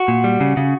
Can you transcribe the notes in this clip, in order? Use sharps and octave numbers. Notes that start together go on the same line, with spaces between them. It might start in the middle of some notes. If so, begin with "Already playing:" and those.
Already playing: F#4
A#2
G3
C#3
C#3